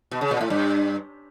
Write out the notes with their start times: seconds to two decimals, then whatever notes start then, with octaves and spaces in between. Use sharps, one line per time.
0.11 B2
0.21 C#3
0.31 A#2
0.41 A2
0.50 G2